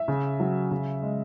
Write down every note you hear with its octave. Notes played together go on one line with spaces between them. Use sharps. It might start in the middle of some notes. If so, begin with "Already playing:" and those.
Already playing: E5
C#3
F#3
C#3
G#3